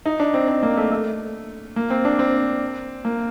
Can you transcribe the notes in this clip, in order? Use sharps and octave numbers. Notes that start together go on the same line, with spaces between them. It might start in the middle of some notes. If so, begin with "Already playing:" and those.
D#4
D4
C4
C4
A#3
A3
A3
A#3
C4
D4
C4
A#3